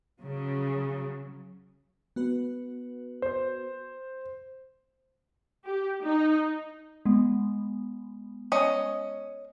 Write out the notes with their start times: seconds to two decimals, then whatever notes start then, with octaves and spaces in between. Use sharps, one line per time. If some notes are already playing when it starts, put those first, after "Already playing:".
0.23 C#3 F#3
2.16 B3 F#4 B4
3.22 C5
5.65 G4
6.02 D#4
7.05 G#3 B3
8.52 C#4 D#5